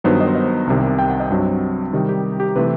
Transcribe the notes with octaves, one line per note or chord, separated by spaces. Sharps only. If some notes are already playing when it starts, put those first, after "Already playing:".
G2 D#3 F#3 B3 D#4 C5
D#5
C5
D#5
C2 C3 D#3
G5
F#5
D#5
G2 F#3 C4
C3 D#3 G3 D#4
G4
G4
C3 E3 A3 C4 B4